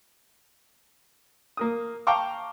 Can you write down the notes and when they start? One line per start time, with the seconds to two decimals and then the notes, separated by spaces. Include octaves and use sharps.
1.57 A#3 A#4 D#6
2.07 F5 G5 A5 A#5 C#6 D6